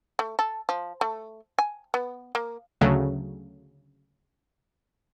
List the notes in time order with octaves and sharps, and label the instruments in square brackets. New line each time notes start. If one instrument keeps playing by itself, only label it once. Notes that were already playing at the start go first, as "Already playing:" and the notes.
[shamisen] A3
A4
F3
A3
G#5
B3
A#3
[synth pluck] D2 C#3 F#3 A3